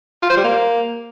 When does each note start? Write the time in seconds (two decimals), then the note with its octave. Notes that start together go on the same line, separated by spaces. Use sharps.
0.23 F4
0.30 C5
0.37 G3
0.44 A#3